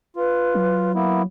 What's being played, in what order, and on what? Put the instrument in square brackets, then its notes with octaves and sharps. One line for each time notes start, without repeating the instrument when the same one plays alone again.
[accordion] F4 [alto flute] B4
[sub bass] F#3
[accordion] A#3 B3 E4